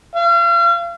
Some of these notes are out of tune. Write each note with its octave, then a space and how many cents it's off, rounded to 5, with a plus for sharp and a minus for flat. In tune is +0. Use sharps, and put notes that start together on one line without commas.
F5 -40